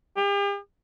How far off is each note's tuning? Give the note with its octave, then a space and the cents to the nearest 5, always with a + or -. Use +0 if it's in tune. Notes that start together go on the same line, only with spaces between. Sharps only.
G4 +45